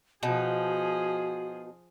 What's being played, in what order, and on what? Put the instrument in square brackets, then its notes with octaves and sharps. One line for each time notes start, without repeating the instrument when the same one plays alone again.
[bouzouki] B2 D#4 [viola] F3 G#4 [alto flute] F#4